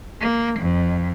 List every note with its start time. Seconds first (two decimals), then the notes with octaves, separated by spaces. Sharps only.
0.21 A#3
0.60 F2